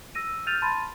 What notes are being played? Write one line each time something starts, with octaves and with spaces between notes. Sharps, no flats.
E6 A#6 D#7
F6 G6 A6 D#7 F7
A5 B5 C6 A6 D#7